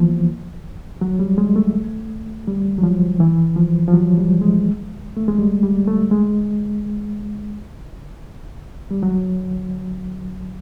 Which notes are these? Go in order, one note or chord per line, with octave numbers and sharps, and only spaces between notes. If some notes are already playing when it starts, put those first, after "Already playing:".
Already playing: E3 F3 A#3 B3
F#3
G3
G#3
A3
G3
F#3
F3
E3
F3
F3
F#3
G3
G#3
A3
G#3
G3
G3
A3
G#3
G3
F#3